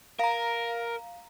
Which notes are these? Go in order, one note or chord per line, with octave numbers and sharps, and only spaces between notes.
A#4 F5 A#5